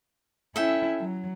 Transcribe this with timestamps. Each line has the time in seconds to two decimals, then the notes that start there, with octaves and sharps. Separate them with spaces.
0.56 C#4 E4 A4 E5 G5
1.00 F#3